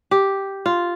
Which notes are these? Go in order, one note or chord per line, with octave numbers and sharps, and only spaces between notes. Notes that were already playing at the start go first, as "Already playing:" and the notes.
G4
F4